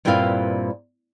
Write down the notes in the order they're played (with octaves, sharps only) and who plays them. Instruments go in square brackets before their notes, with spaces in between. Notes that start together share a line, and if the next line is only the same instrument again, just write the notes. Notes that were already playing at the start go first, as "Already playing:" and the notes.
[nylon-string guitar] G2 A#2 C4 E4 B4 F5